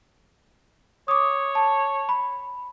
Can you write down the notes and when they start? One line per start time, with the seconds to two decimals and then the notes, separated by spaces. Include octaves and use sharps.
1.08 C#5 D6 D#6
1.55 A5
2.09 B5